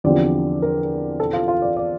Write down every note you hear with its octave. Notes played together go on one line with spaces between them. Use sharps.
E2 D3 F3 C4 G4 D5
A#4
A4
F4
F4
D5
D5